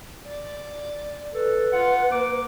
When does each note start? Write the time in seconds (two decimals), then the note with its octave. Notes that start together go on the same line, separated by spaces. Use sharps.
0.27 D5
1.33 A4 B4
1.72 F4 F#5
2.11 A#3 D6